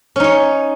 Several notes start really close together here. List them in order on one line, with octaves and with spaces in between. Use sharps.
C#4 D#4 C#5